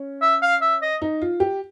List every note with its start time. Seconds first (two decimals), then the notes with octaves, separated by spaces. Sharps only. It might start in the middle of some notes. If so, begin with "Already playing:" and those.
Already playing: C#4
0.22 E5
0.42 F5
0.62 E5
0.82 D#5
1.02 D#4
1.22 F4
1.40 G4